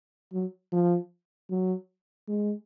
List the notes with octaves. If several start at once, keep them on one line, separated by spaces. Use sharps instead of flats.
F#3
F3
F#3
G#3